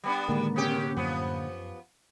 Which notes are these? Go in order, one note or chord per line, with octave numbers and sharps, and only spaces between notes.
G3 B3 D4
A2 D3 D#3 G#3 A#3 A#4
C3 C#4 G4
F#2 F3 B3